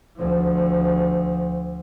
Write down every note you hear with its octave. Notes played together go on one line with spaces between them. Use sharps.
D2 F3